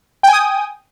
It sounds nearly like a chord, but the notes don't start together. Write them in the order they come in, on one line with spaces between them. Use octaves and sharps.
G5 G#5 D#6